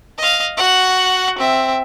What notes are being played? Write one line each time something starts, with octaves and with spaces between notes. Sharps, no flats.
D#5 F5
F#4 F#5
C4 E5